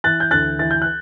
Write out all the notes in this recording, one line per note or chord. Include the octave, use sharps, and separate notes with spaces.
E3 F#6 A6
G6
D2 F#6 A6
E3 A6
G6
F#6